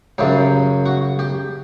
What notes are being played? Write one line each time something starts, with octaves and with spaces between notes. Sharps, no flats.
F#2 C#3 F#3 G4
F#4
G4